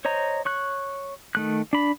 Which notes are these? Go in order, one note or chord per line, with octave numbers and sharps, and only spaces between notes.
C5 C#5 D#5 A#5
C#5 C#6 F#6
D#3 A3 F#6
D4 B5